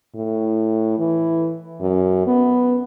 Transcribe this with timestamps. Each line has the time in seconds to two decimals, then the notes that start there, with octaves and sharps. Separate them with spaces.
0.15 A2
0.98 E3
1.81 F#2
2.27 B3